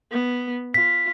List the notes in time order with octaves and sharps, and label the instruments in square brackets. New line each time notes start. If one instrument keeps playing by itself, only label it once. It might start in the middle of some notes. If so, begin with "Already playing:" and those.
[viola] B3
[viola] F4 [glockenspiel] B6